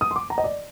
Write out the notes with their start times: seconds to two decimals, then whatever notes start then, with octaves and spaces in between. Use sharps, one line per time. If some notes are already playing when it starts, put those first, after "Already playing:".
0.01 D#6
0.11 C6
0.16 D6
0.30 A#5
0.38 D#5
0.44 D5